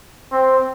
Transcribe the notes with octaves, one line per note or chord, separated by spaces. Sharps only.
C4